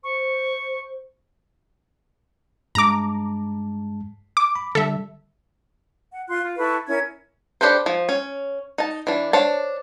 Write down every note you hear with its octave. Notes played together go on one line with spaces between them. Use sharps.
C5 C#6
G2 G#3 A5 A#5 D6
D6
B5
D3 G3 A4 E5
F#5
F4 C6 F#6
F4
E4 A4 B4 C#6
C#4 E4 A#4 G#6
D4 G4 A4 B4 C5
F3
C#4
D#4 A5
E3 D4
D4 C5 C#5 A5